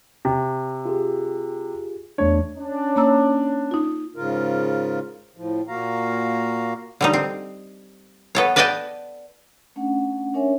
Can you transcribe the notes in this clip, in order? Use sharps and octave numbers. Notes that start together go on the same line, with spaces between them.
C3
F4 G4 G#4
E2 A3 D4 C#5
C#4 D4
A#3 A#5 E6
D#4 F4
G#2 C#3 F4 A#4
A2 F3
A#2 A#3 F#4 F5 A#5
D3 G3 D#4
C4
B3 A4 C#5
B4 D5 D#5 F#5 G5 A5
A3 C#4 D4 F#5
C#4 D4 A#4 C#5 E5 G#5